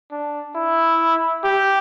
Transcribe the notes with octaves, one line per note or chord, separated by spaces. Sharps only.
D4
E4
G4